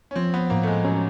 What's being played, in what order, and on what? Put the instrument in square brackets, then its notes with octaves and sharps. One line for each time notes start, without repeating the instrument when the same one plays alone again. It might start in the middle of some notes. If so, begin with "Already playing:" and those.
[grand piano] C#4
[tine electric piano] F3 [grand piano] C4
[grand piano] B3
[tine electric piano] A2 [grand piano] A#3
[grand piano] A3
G#3
[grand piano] F#3 [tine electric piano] C#4